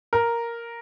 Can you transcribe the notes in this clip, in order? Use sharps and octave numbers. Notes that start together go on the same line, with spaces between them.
A#4